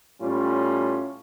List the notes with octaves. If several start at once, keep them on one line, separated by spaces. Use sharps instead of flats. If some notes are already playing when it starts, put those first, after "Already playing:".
A2 G3 C#4 F4